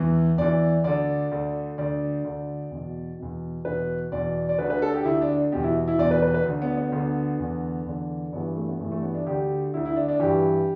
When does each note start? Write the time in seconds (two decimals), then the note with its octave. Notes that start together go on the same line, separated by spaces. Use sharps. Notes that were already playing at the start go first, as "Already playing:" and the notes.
Already playing: E2 E3
0.38 E2 E3 D5
0.84 D2 D3 D5
1.31 D2 D3
1.78 D2 D3 D5
2.24 D2 D3
2.71 E2 B2
3.19 E2 B2
3.65 E2 B2 B4
4.12 E2 B2 D5
4.49 D5
4.58 D2 B4
4.61 D3
4.70 B4
4.82 A4
4.94 G4
5.05 D2 D3 E4
5.22 D4
5.52 E2 B2 G4
5.64 E4
5.88 E4
5.98 E2 B2 D5
6.11 B4
6.22 B4
6.34 B4
6.45 D2 D3
6.62 B3
6.77 B3
6.92 D2 D3 B3
7.39 E2 D3
7.86 E2 D3
8.33 G2 E3 B3
8.56 A3
8.68 B3
8.80 G2 A3
8.83 E3
8.92 A3
9.02 B3
9.14 D4
9.26 D2 D3 G4
9.74 D2 D3 E4
9.85 E4
9.96 D4
10.08 D4
10.20 G2 E3 G4